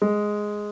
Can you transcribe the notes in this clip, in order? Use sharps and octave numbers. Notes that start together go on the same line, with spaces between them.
G#3